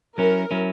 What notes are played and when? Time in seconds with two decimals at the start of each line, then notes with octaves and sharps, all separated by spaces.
0.18 F#3 C#4 E4 A#4
0.51 F#3 C#4 E4